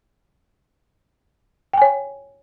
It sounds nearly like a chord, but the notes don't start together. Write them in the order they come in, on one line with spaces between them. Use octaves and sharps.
G5 G#5 C#5